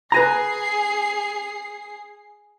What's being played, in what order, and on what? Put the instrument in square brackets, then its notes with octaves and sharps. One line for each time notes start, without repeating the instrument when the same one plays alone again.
[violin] G#4 C7 [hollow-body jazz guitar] B4 G#5 A#5